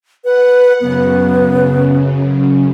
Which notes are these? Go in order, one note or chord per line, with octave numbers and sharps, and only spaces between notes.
B4 F#5
F#2 C#3 B3